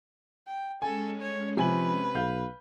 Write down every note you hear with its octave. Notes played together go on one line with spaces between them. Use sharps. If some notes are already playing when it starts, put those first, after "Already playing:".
G5
G#3 C#4 A4 G#5
C#5
C3 F3 B4 G#5 F#7
B1 F5 G6